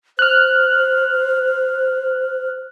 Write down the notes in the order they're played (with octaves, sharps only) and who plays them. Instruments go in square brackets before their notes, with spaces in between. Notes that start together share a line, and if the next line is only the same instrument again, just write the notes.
[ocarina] C5 [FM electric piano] F6 F#6